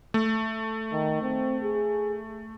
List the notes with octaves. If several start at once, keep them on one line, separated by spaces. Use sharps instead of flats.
A3
D#3
C4
G#4